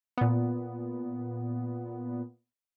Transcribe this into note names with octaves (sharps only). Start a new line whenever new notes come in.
A#2 B3